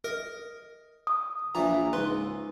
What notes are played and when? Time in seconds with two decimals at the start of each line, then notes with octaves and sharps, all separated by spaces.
0.04 A#4 D#5
1.07 D#6
1.55 A#1 A#2 E3 A#5
1.93 C#2 G#2 B4 C6